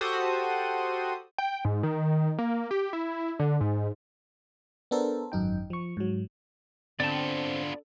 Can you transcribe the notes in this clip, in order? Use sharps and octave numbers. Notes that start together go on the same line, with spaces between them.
F#4 G4 A4 C5 D#6
G5
G#2
D#3
A#3
G4
E4
D3
G#2
B3 D4 A4 A#4 C5
G#1 F#2 D#4 G5
F3 C#6
G#2 F#3
D3 B3 C4 F4 D5 A5